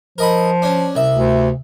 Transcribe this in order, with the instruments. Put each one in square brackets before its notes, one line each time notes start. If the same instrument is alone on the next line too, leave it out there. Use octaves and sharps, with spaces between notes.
[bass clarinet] F3 [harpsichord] A#4 D#5 B5
[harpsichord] C#4 D4
C2 E5
[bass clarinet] D2